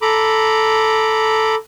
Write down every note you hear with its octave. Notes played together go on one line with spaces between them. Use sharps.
A4 A#5 B5 D6